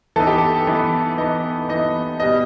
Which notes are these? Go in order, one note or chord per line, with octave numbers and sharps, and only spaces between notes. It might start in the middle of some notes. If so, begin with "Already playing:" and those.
E3 B3 D#4 A4
G4
A4
E3 B3 D#4
E3 B3 D#4 D#5
E3 B3 D#4 D#5
B2 G3 B3 D#5